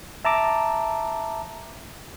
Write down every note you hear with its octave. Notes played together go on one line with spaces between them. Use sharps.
E5 A5 A#5 D6